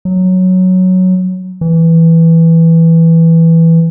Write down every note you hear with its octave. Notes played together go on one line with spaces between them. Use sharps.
F#3
E3